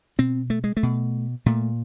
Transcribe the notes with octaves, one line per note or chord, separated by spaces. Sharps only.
B2 C4
A3
G#3
A3
B2
A#2 A3